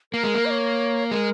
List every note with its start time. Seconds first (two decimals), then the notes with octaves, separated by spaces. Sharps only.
0.13 A#3 A#4
0.24 G#3
0.35 A#3
0.46 D#5
0.50 C#5
1.11 G#3 A#4